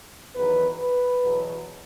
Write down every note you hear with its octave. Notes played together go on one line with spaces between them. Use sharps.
E2 D#3 F#3 B4
B4
E2 B2 F#3